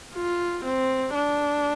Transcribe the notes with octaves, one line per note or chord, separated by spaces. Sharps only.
F4
C4
D4